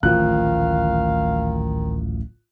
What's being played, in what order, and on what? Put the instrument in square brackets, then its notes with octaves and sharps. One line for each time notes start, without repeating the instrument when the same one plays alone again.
[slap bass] D1 A1 A#2 [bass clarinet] D#3 [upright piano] F3 F#6 [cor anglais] F5